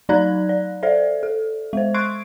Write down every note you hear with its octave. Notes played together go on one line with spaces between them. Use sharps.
F#3 D#4 D5 A#5 F#6 G#6
D5
A4 C5 D5 E5
A4
G#3 C5
C6 C#6 F#6 G#6 C7 D7